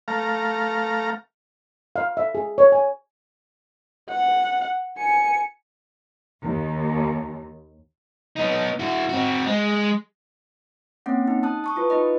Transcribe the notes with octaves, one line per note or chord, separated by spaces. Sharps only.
A3 F5 A#5
F5
E5
G#4
C#5
G#5
F#5
G#5 C#7
D#2
B3 D#4
E4 F#4
C4 F#4
G#3
A#3 C4 C#4 F#5
D#4
A5 D#6 F#6
A5 C#6 D#6
E4 F4 B4
D#4 F4 D#5